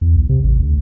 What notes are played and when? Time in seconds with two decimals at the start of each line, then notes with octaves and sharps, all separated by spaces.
0.01 E2
0.16 B1
0.29 C3
0.44 A1
0.59 D2